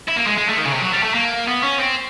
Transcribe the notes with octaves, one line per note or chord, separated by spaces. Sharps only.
E4
A#3
G#3
G#3
A3
D#3
C#3
C3
F#3
G3
A3
A#3
B3
C#4
C4